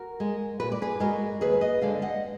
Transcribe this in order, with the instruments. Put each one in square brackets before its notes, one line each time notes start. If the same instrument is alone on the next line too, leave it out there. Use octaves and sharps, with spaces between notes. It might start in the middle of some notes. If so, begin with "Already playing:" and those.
Already playing: [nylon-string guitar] F#4 A#4
G#3
A#2 B4
D5
G#4 B4
G#3 F#4 A#4
D#2 G#4 B4
B4 D#5
D3 G#3 D5 F5
D#5 F#5